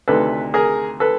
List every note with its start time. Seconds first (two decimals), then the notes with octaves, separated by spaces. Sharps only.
0.08 D2 C3 D#3 A4 B4
0.54 G#4 A#4
1.00 A4 B4